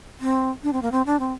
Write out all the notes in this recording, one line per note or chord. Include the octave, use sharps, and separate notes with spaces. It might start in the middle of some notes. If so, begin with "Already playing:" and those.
C4
D4
C4
A#3
C4
D4
C4